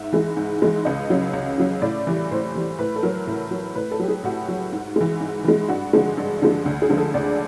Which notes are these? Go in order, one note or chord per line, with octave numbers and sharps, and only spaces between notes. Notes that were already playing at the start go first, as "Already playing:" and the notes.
Already playing: G#2 E5
E3 G#3
G#2
E3 G#3
C#2 D#5
C#3 F#3
C#2
C#3 F#3
A2 D5
E3 G3
A2 C5
E3 G3
A2 B4
A4
F#3 A#4
A2
F#3
A2 B4
A4
F#3 G4
G#4
A2 F#4
F#3
G#2
E3 G#3
G#2
E3 G#3
G2 F#4
D3 F3 G#3
G2
D3 F3 G#3
D2
G#4
D3 F3 G#3
A4
D2 D5